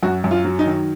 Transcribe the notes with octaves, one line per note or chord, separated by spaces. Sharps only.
F#2 F#4
F#2
F4
F#3
D#4
D#3